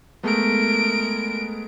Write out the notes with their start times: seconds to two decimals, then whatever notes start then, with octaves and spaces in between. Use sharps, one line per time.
0.23 G#3 A3 B3 A#4 D7